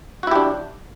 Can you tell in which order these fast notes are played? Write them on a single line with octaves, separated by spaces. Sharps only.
F#4 E4 G4 D4